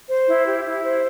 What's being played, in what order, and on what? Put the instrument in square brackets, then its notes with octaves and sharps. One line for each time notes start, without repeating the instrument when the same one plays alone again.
[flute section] C5
E4
G4
E4
C5